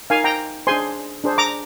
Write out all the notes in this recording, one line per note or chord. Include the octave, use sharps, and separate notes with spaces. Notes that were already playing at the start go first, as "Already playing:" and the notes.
D#4 A#4 F5 G#5
G5 A#5
D4 G#4 C5 G#5 C6
D4 G#4 C5
A#5 D6